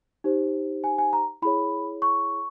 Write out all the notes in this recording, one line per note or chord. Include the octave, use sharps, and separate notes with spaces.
D#4 G4 C5
G#5
G#5
A#5
E4 G#4 C#5 B5
C#6